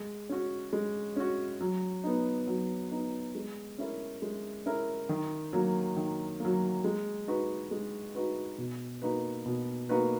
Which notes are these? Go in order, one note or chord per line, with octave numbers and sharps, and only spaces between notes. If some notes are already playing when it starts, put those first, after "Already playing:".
Already playing: G#3
C#4 F#4
G#3
C#4 F#4
F#3
B3 D#4
F#3
B3 D#4
G#3
C#4 E4 A#4
G#3
C#4 E4 A#4
D#3
F#3 A#3
D#3
F#3 A#3
G#3
D#4 F#4 B4
G#3
D#4 F#4 B4
B2
A#3 D#4 F#4 B4
B2
A#3 D#4 F#4 B4